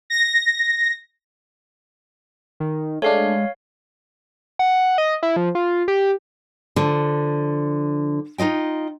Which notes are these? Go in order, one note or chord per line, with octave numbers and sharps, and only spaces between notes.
A#6
D#3
G#3 A3 D4 C#5 F5
F#5
D#5
E4
F3
F4
G4
D3 F3
D#4 F4 D#5 G5